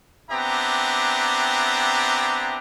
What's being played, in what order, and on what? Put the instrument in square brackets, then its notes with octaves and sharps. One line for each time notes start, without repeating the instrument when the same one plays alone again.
[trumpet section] B3 C4 D4 G4 E5 A#5